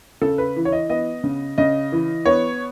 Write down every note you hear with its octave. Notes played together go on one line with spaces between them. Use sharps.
C#3 A4
B4
E3
C#5
D#5
B3 D#5
C#3
C#3 D#5
E3
B3 C#5